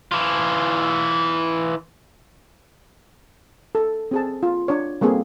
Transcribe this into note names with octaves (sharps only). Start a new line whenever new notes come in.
E3 F4
A4
C4 G#4 A5
F4
D4 C#5
G3 A#3 C4 G#4 A4